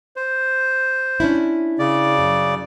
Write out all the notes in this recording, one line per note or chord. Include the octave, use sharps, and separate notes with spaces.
C5
C#4 D4 E4
C#3 D5
F#2